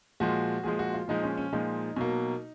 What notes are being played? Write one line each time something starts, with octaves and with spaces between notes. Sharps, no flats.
A#2 F3 G#3 F#4
A#2 F3 G#3 G#4
F#4
F4
A#2 F3 G#3 D#4
C#4
C#4
A#2 F3 G#3 D#4
B2 F#3 A#3